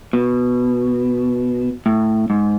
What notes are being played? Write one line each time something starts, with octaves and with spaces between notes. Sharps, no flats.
B2
A2
G#2